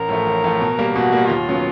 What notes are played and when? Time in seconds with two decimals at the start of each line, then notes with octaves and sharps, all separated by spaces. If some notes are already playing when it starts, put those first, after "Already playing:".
Already playing: A1 A#4
0.09 A2 F3 A3
0.27 A1
0.44 A2 F3 A3
0.61 B2
0.79 G3 A#3
0.95 B2 F#4
1.13 G3 A#3
1.30 D#2 F4
1.48 C#3 F#3 B3